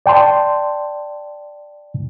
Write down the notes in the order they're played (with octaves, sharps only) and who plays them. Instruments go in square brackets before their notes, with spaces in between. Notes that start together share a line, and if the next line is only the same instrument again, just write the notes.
[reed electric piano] D5 G5 A5 C6